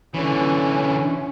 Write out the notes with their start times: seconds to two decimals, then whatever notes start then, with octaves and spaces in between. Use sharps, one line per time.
0.14 D3 E3 C#4